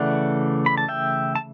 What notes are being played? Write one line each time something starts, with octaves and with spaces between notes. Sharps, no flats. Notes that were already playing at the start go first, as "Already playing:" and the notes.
Already playing: C#3 E3 A3 D5 F#5
B5
A5
E5 G5
A5